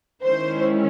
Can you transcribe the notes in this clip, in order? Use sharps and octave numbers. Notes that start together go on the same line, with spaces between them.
D#3 G#3 C#4 E4 C5